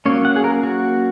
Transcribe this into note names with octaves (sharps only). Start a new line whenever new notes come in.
F#3 A#3 C#4 C#5
F#5
G#4
A#4
F#4